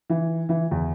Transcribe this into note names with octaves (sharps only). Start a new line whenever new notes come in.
E3
E3
E2